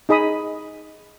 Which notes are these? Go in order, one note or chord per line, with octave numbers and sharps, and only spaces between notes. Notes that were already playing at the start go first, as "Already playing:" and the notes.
D#4 G#4 D#5 B5 D#6